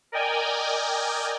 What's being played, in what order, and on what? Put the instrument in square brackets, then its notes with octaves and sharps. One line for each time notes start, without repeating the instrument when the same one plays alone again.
[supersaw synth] A#4 D5 D#5 G5 G#5